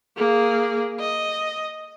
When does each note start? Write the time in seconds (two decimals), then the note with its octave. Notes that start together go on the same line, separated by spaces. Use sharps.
0.16 A#3 G#4
0.99 D#5